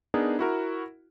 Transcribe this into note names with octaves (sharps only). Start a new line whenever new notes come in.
B3 D4 D#4 G#4 A#4
E4 F#4 A#4